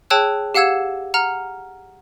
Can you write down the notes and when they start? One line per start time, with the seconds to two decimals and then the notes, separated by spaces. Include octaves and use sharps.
0.10 G#4 C#5 G5 A5 E6 F#6
0.55 G4 F5 F#5 E6 G#6 E7
1.14 F#5 A#5 F6